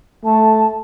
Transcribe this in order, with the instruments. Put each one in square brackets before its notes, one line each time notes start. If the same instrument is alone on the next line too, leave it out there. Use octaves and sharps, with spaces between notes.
[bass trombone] A3 [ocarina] A5